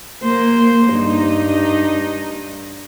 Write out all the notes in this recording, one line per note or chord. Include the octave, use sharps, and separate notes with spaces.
A#3 C5
G2 D#4